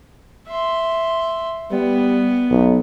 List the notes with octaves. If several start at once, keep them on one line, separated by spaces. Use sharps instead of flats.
E5 C6
G3 B3
B1